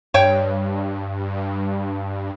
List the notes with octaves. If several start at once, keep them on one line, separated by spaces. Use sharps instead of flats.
G2 C#5 G5